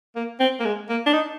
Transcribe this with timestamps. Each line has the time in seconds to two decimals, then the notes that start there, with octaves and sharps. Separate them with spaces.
0.16 A#3
0.40 C4
0.60 A#3
0.65 G#3
0.89 A#3
1.07 D4
1.13 D#4